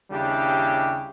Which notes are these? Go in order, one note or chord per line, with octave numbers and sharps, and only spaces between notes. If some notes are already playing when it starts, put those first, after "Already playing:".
D#2 C#3 G3 D4 E4 G4